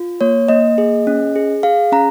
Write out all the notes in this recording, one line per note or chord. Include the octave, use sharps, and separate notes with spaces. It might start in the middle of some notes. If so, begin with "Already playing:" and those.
Already playing: F4
A#3 C#5
A#3 D#5
G#4
C#4
G#4
G#4 F5
C#4 A#5